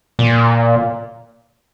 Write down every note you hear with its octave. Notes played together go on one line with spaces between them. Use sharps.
A#2